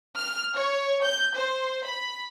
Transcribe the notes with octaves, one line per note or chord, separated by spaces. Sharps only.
F6
C#5
G6
C5
B5